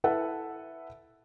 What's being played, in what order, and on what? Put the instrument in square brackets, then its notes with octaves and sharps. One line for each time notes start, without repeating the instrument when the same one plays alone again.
[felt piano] E4 A4 B4 E5 F#5